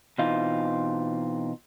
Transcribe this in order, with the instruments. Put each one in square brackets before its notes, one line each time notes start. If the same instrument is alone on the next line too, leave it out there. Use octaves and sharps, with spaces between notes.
[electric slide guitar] B2 E3 C4 D#4 F4